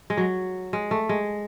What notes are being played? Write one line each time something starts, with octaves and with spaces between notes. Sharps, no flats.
G#3
F#3
G#3
A3
G#3